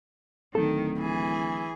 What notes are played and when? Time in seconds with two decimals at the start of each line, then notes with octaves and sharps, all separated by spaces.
0.55 D1 D#3 A4
1.01 E3 G#4